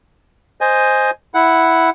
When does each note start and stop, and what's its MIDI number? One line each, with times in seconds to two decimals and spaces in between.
0.61 1.10 72
0.61 1.10 75
0.61 1.10 80
1.34 1.90 64
1.34 1.90 78